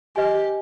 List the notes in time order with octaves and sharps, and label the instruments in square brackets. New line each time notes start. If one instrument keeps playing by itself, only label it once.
[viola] G4 [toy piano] B4 D#5 G#5